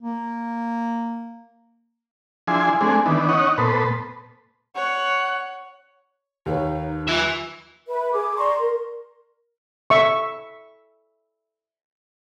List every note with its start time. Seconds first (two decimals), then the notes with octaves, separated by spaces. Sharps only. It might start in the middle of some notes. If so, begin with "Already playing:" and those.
0.01 A#3
2.48 F3 D4 E4 G#4 G#5 C6
2.81 G#3 A3 C4 D4 G#4
3.06 D#3 E3 B3 D4
3.29 C#4 D#4 C#5 D#5 F#5
3.58 A#2 B3 A4 B4 C5
4.75 C#5 F#5
6.46 D#2 D#4 B4 C#5
7.08 F4 E5 G#5
7.88 B4 E5
8.12 G#4 D6
8.37 D5 A#5 C6 C#6
8.58 A#4
9.90 E5 C#6